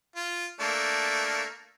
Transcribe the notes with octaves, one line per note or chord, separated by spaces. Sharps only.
F4
A3 A#3 D4